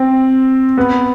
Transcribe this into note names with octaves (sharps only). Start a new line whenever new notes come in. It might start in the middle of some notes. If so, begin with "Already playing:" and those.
Already playing: C4
B3